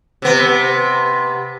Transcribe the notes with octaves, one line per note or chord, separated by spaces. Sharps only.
C3 B3